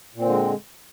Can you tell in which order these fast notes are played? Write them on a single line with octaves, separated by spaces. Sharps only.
A#2 C4 D3 G#3